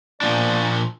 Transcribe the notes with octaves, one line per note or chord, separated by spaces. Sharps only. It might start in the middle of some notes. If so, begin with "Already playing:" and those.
A#2 F3 A#3 B3 D4 D5